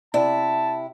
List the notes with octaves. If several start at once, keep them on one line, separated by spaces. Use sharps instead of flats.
C3 E4 D5 A5